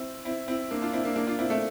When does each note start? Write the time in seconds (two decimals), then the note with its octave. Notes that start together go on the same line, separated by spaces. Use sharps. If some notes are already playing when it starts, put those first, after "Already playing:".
Already playing: C4 E4
0.25 C4 E4
0.48 C4 E4
0.71 A#3 D4
0.82 D4 F4
0.93 C4 E4
1.04 A#3 D4
1.16 A#3 D4
1.27 D4 F4
1.39 C4 E4
1.50 A3 C4